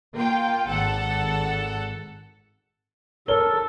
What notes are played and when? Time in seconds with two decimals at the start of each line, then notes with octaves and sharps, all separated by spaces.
0.14 A#3 F4 G5
0.67 G#1 A4 F#5
3.28 A4 A#4 C#5 G7